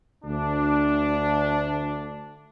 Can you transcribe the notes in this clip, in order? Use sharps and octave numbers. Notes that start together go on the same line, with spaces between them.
D2 D4